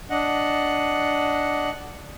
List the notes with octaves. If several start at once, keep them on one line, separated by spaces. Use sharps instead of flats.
D4 D#5 F#5